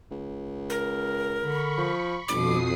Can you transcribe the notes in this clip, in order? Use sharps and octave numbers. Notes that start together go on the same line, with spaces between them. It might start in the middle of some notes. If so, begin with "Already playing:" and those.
C#2
A#4
D3 B5 C#6
F3
G1 F2 B2 D6 D#6 C7